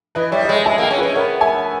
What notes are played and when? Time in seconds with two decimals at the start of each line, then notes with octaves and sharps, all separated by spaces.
0.15 E3 B4 D#5
0.32 G3 C#5 E5
0.43 D#5
0.49 G#3 C#5 E5
0.66 G#3 E5 G#5
0.78 A#3 D#5 G5
0.91 C#4
0.98 G#4 B4
1.03 C#4
1.15 B3 A#4 C#5
1.40 E5 G#5